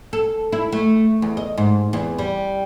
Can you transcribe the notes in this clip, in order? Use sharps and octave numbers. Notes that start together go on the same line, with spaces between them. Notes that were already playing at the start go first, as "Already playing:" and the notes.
A4
E4
A3
E2
D#5
G#2
E2
G3